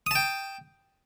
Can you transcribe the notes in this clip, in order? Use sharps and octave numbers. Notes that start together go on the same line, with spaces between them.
G5 A5 D#6